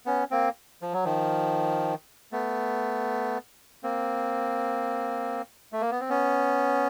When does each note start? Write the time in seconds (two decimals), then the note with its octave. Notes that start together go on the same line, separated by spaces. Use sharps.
0.06 B3 C#4
0.31 A#3 C4
0.82 F3
0.93 F#3
1.04 D#3 F3
2.32 A3 B3
3.83 A#3 C4
5.72 A3
5.81 A#3
5.91 B3
6.00 C4
6.09 B3 C#4